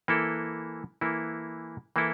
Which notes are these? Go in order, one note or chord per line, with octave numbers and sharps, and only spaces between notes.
E3 A#3 E4 A4
E3 A#3 E4 A4
E3 A#3 E4 A4